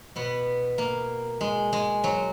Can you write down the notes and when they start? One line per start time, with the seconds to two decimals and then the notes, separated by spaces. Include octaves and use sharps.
0.16 B2 B3
0.78 A#3
1.41 G#3
1.73 G#3
2.04 F#3